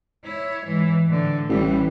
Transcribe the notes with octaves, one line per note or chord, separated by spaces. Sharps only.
E4 C#5
G#2 E3
A2 D3
A1 E3 G3